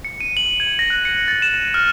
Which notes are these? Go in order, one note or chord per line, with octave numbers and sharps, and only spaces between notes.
C#7
D#7
F#7
G#6
A#6
F#6
C#7
A6
E7
D#7
F6